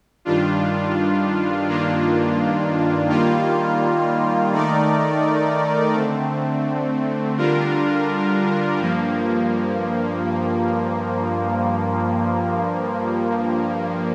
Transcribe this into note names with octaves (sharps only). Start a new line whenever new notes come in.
G2 D#3 G3 D4 F4
G2 D#3 A#3 D4 F4
D#3 G3 A#3 F4
D#3 A3 D#4 A#4 D5
D3 A3 C4
D3 G3 D4 F4 A#4
G2 F3 A#3